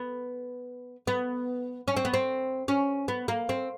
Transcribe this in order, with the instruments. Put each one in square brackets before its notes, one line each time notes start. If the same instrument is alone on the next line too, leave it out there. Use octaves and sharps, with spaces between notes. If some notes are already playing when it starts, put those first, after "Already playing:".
Already playing: [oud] B3
B3
C#4
C4
B3
C4
C#4
B3
A#3
C4